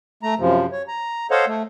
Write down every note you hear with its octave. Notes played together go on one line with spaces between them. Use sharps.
A3 A#5
F#2 C3 F3
C#5
A#5
A4 C5 C#5 D#5 F5 F#5
A3